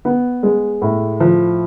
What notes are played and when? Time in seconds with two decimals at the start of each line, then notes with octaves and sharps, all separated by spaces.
0.05 B3
0.43 G#3
0.82 A2
1.20 F3